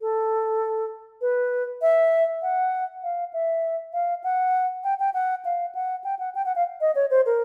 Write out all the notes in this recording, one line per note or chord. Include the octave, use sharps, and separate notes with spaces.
A4
B4
E5
F#5
F5
E5
F5
F#5
G5
G5
F#5
F5
F#5
G5
F#5
G5
F#5
F5
D#5
C#5
C5
A#4